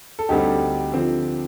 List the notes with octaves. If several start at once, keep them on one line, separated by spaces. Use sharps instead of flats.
A4
D2 D3 G3 C4 D#4 G4
D3 F3 C4